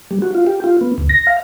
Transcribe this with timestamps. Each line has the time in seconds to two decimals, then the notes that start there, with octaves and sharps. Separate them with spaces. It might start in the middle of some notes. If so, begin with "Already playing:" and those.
0.11 G3
0.22 F#4
0.35 F4
0.47 G4
0.64 F4
0.81 B3
0.98 D2
1.09 A#6
1.27 F5